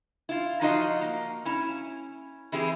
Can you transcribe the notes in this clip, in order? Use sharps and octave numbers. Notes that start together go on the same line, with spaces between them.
E4 F4
F3 D#4 F4 F#4 D#5 F5
A#3
C#4 E4
E3 C4 E4 G4 G#4